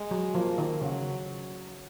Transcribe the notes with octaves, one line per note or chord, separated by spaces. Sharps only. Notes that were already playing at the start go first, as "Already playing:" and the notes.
Already playing: G#3
F#3
F3 A#3
D#3
C#3 F#3